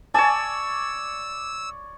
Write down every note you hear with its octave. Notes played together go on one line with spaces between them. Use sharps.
C#5 D5 G#5 A5 E6